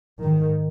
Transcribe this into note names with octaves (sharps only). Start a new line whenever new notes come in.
G#2 D#3